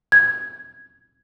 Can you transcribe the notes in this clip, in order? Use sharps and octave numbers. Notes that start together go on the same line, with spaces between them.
G#6